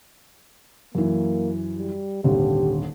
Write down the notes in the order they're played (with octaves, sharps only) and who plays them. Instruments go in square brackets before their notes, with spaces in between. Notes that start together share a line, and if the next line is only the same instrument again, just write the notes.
[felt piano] F#2 E3 [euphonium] A#3
[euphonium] G3
[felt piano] D#1 G#1 D3 [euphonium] G4